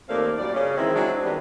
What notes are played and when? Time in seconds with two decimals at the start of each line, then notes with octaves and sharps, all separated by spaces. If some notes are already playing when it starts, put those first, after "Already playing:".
0.09 D#2 A3 A#3 C4 D5 F5
0.38 F#2 A#2 G3 D5
0.54 C#3 C#4
0.77 D#3 E3 G#3 C4 E4
0.95 F#3 G#3 C4 D4 E4
1.23 D#3 G3 B3